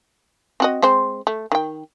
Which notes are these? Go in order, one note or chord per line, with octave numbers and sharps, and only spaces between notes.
C4 F#4 D#5
G#3 C4 C5
A3
D#3 G5